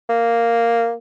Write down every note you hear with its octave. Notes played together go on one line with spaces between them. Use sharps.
A#3